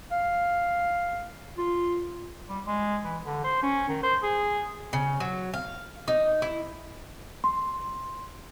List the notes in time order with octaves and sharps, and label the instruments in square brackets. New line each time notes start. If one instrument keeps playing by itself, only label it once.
[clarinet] F5
F4
[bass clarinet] G3
G#3
E3
D3
C5
C#4
D#3
C5
G#4
[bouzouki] C#3
F#3
F5
D#4
E4
[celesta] C6